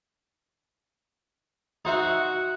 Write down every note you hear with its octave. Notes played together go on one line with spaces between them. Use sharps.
D#4 F#4 C5 E5